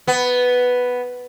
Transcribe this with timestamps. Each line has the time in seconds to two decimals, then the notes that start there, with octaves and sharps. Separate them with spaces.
0.07 B3